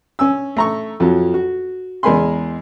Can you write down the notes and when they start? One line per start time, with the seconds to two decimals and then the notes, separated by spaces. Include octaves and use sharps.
0.19 C#4 G#5 E6
0.57 A3 A#5 C#6
1.00 F2 F3 F#3
1.34 F#4
2.03 E2 G#3 A#4 G#5 B5 C6